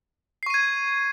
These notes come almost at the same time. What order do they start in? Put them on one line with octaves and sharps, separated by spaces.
C7 C#6 D#7 G#6